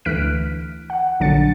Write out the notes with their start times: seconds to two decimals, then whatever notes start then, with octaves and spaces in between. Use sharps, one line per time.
0.05 D2 E3 F6 F#6 B6 D7
0.90 F#5
1.20 A#1 D3 F#3 D4 A6 C#7